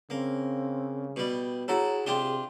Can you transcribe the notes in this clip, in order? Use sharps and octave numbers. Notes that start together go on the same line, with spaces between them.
C#3 A#3 C4
B2 G3
E4 F#4 G#4 A4 C#5 A#5
C3 D4 F4 G4 C6 G7